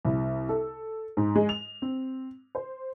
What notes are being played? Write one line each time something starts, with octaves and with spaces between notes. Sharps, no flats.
C2
A4
G#2
G#3
F7
C4
C5